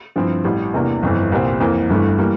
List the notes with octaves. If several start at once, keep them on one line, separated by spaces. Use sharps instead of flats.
G2 F3 C4 E4
A1 A2 G3
E2 C3 E3 A#3 D4
G1 F2 E3
C2 A#2 G3 C4
F2 E3 A#3
G1 G2 E3 A3 E4
E3 G3 A#3